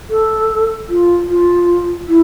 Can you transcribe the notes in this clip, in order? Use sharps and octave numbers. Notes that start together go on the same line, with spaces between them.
A4
F4
F4
E4